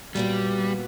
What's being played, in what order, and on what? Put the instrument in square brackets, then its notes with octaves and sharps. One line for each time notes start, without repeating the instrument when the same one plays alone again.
[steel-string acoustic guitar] A#2 F#3 B3 [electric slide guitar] G3